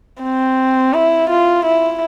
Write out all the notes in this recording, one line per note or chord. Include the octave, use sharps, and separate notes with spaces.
C4
E4
F4
E4